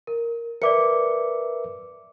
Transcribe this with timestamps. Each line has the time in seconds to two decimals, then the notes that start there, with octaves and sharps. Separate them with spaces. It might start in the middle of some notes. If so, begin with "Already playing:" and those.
0.07 A#4
0.62 A#4 B4 D5 E5 D6 C#7